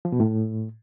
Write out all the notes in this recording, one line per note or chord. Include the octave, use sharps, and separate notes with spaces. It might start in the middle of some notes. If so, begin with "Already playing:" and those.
F3
B2
A2